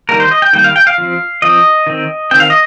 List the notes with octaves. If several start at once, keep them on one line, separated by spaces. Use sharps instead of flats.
D#3 G3 A#3 A#4
C5
D#5
G5
D#3 G3 A#3 G5
F5
G5
F5
F3 C4
F3 C4 D#5
D#3 C4
D#3 C4 G5
F5
D#5